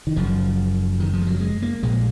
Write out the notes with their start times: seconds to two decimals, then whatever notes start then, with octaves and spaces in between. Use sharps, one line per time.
0.07 D#3
0.16 F#1 F#2 C#3 F3
1.00 D#3
1.13 F3
1.21 G#3
1.27 F#3
1.40 G#3
1.62 A#3
1.83 A#1 A#2 G#3